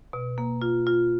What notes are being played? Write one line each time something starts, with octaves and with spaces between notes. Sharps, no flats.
B2
A#3
F4
F4